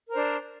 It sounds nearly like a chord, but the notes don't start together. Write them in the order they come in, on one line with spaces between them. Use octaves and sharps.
A#4 C5 D4